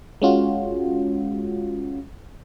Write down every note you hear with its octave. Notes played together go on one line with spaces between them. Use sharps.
G#3 C#4 F4 F#4